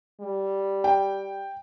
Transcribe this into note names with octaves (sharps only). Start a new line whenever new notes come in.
G3
G5